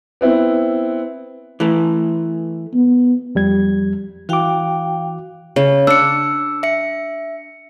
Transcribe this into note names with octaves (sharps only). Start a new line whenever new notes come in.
B3 C4 E4
E3 A3
B3
F2 G3 G#6
E3 F#4 F5 G5 D6
C#3 C#5
D4 E6 C#7
E5 C#7